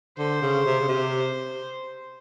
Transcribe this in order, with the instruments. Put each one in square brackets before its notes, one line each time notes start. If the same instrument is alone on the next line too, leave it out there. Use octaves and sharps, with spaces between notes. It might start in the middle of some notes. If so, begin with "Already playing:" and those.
[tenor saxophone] D3 [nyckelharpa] C5
[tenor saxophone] C#3
C3
C#3
C3